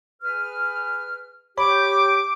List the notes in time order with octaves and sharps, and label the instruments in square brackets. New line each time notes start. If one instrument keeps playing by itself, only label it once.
[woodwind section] G#4 B4 F6
[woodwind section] G4 [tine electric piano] C#5 B5 [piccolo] D6